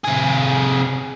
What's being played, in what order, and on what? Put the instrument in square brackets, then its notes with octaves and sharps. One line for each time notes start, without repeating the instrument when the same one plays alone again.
[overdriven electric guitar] C3 G#4